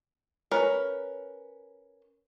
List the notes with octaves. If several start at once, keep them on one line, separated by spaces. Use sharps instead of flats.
C#4 A#4 B4